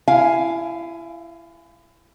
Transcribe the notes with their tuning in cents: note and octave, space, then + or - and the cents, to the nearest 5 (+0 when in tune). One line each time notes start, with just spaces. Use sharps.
E4 +30 F5 +0 G#5 +0